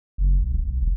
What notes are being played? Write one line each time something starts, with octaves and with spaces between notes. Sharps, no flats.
F#1
B1
D1
B1
E1